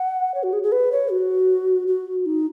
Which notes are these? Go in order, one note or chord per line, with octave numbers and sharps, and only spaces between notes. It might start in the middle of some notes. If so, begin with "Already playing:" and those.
Already playing: F#5
C#5
F#4
G#4
G#4
B4
C#5
F#4
F#4
D#4